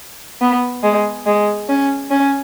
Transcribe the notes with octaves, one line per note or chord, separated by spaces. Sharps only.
B3
G#3
G#3
C#4
C#4